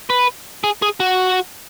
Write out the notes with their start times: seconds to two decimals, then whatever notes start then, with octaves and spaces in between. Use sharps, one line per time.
0.10 B4
0.64 G#4
0.82 G#4
1.00 F#4